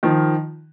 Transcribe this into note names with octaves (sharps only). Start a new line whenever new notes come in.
D#3 F3